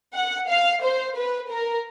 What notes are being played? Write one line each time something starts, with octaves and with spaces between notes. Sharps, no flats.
F#5
F5
C5
B4
A#4